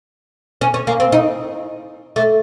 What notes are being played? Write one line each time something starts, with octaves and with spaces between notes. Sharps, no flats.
C#4
C#4
A#3
C4
D#4
A3